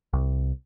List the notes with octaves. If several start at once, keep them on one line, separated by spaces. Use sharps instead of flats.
C2